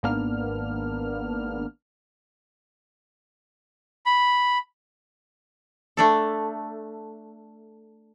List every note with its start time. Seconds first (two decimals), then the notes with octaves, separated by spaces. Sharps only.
0.03 G#1 G#2 A#3 B3 D4 F6
4.06 B5
5.97 A3 D4 A4